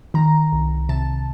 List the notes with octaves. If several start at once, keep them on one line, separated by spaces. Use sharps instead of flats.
D#3 A#5
C2
C3 A5